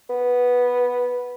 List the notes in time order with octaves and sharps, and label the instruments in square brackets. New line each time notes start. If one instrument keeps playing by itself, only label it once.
[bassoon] B3